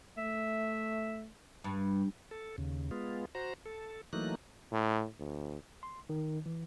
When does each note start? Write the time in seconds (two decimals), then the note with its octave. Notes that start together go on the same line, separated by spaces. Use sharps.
0.17 A3 E5
1.64 G2
2.31 A4
2.58 D#2 C#3
2.91 G#3 B3 F4
3.35 F#4 C5 A#5
3.66 A4
4.13 E3 F#3 A3 A#3 D#4 F#6
4.72 A2
5.19 D2
5.83 C6
6.09 D#3
6.46 E3